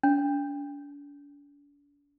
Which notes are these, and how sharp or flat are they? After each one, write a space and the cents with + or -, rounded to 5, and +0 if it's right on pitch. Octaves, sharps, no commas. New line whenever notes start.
D4 -40